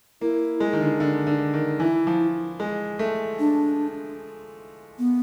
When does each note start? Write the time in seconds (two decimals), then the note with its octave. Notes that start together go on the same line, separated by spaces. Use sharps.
0.21 A#3 E4
0.60 G#3
0.73 D#3
0.81 D3
1.00 D3
1.27 D3
1.54 D#3
1.80 E3 E4
2.07 F3
2.60 G#3
2.99 A3
3.39 D4
4.99 B3